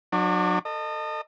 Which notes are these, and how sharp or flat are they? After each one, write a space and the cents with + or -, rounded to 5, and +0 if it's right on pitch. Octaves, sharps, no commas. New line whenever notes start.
F#3 -20 D4 +40 D6 +0
A4 +25 D#5 -25